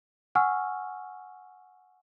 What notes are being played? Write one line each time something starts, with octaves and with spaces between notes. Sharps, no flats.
F#5 G#5 C#6 E6 F6